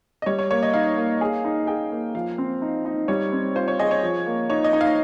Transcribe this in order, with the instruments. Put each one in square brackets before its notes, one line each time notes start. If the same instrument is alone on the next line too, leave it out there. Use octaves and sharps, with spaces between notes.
[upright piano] D#5
[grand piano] G3 [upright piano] C#5
[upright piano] C#5
[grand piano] A#3 [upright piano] C#5
[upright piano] D#5
[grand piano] D#4 [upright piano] F5
[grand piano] A#3
G#4
D#4
[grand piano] G#4 [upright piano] G5
[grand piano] A#3
[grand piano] F3 [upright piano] F5
[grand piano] C4
D#4
D#4
[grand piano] G3 [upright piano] C#5
[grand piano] C4
[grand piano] F4 [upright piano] C5
[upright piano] C#5
[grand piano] G#4 [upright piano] D#5
[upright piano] C#5
[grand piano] F3
A#3
[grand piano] D#4 [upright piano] C#5
[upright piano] D#5
[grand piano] D#4
[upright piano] F5